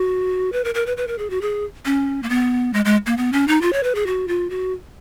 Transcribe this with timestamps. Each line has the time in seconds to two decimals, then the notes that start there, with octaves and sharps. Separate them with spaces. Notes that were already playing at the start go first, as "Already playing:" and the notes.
Already playing: F#4
0.53 B4
0.64 A#4
0.75 A#4
0.86 B4
0.97 B4
1.08 A#4
1.18 G#4
1.30 F#4
1.41 G#4
1.85 C#4
2.23 A#3
2.30 B3
2.73 G#3
2.85 G#3
3.06 A#3
3.17 B3
3.33 C#4
3.48 D#4
3.62 F4
3.73 C#5
3.83 B4
3.95 G#4
4.07 F#4
4.28 F4
4.50 F#4